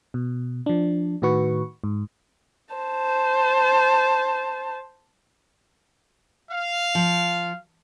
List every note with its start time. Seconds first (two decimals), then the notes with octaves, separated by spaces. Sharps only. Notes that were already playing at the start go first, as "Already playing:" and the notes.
0.14 B2
0.66 F3 D4
1.22 A2 D#3 F#4 B4 C#6
1.84 G#2
2.75 C5 A5
6.51 F5
6.95 F3